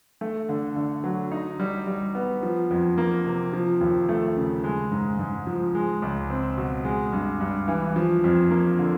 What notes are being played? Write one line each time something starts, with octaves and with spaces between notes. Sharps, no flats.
A3
D3
D3
F#3
D#4
G3
G3
B3
F3
F2
A#3
C3
F3
D#2
A3
C#3
G#3
G#2
G#2
F3
G#3
C#2
C4
B2
G#3
G2
G2
E3
F3
F2
A#3
D3